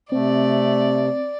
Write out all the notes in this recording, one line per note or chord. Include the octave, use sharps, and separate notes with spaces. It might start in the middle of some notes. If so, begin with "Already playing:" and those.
C3 A3 C4 D5